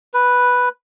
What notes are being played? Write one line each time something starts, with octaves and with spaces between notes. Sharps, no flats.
B4